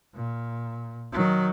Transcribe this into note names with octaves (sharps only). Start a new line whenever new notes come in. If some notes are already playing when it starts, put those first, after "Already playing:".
A#2
D#3 F#3